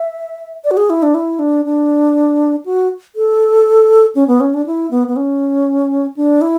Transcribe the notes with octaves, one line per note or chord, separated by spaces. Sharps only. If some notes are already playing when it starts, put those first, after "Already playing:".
Already playing: E5
D5
F#4
G#4
E4
D4
E4
D4
D4
F#4
A4
C#4
B3
C#4
D4
E4
B3
B3
C#4
D4
E4